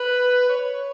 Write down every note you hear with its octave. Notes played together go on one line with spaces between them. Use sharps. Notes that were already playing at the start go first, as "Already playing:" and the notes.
Already playing: B4
C#5